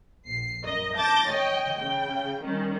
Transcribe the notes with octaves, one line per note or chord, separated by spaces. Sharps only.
A#1 C7
F#2 A#4 D#5
A5 D6 G6 A6 A#6
C#5 D#5 G5
C#3 G5
D#3 G3 C#4